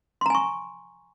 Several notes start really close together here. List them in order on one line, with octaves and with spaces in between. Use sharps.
C6 A#5 G#5 C#6